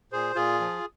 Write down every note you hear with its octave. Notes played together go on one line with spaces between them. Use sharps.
A#2 G#4 C5
A#2 F4 G#4
F3